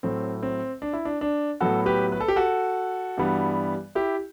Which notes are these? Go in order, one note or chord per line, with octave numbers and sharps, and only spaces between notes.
A2 F#3 A3 C4
C4
D4
E4
D4
D4
A2 F#3 B3 F#4 A4
G4 B4
B4
A4
G4
F#4 A4
G2 E3 G3 B3
E4 G4